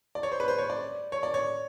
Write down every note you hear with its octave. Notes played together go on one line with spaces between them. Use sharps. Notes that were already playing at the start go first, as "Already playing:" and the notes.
D5
C#5
C5
B4
C5
C#5
D5
C#5
D5
C#5